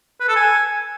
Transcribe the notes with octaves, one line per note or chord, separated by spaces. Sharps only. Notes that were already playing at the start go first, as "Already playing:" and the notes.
B4
A4
G#5